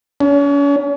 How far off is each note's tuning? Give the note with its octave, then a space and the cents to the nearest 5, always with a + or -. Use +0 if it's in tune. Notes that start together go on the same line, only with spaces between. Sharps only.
C#4 +40